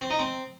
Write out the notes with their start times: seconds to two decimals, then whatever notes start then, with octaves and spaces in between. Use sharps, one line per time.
0.01 C4
0.10 D#4
0.19 C4